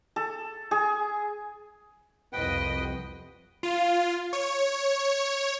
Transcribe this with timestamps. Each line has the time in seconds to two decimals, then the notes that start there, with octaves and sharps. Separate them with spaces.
0.16 A4
0.71 G#4
2.33 C2 F2 B4 D#5 F#5 G5
3.63 F4
4.33 C#5